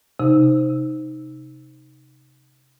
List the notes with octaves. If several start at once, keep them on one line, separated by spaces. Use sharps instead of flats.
C3 D#4